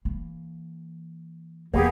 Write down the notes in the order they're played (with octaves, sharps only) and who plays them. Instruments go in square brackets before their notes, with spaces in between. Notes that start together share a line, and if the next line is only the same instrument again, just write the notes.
[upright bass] E3 A#3
[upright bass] E2 F3 [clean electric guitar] A#3 B3 [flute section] G4 G#4